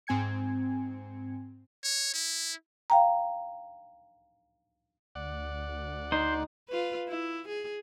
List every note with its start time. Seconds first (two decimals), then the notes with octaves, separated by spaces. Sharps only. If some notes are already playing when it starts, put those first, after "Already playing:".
0.07 G#2 C4 G#5 G#6 C#7
1.84 C#5
2.14 E4
2.90 F5 G5 A#5
5.15 D2 D5 F#5
6.12 D#4 C5
6.69 F4 B4
7.08 E4
7.48 G#4